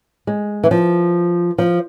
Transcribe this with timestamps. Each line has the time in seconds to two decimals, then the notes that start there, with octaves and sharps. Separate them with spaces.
0.27 G#3
0.64 E3
0.71 F3
1.58 F3